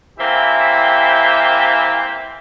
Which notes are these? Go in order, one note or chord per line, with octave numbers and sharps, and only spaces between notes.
E3 A#3 C4 G4 E5